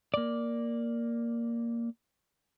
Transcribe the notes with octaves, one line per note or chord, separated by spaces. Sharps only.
A#3 D5